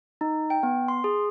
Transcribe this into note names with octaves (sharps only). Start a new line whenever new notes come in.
D#4
G5
B3
C6
G#4